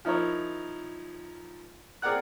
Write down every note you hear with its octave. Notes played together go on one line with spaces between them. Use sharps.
F3 D#4 E4 A#4 C#5
C4 G#4 A#4 D5 F#5 F#6